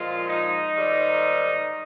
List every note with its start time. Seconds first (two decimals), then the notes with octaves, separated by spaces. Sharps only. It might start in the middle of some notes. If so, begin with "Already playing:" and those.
Already playing: A#2 F3 G#3 F4
0.27 D#4
0.75 G#2 D#3 G3